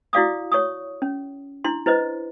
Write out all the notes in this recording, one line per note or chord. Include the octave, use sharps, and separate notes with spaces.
E4 F#4 D5 F5 D6 D#6
C#5 C#6 D#6
C#4
D4 E4 C6
E4 B4 C5 D#5